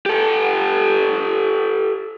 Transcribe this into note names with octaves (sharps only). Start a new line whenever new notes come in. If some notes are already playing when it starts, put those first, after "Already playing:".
G4 A4